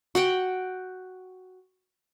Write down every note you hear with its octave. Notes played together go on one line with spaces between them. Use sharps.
F#4 F#5 G5